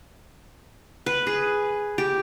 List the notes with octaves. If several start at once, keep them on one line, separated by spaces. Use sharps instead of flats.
B4
G#4
G4